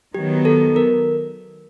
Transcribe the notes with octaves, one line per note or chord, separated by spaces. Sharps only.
D#3 F#3 B3 G4
A4
A#4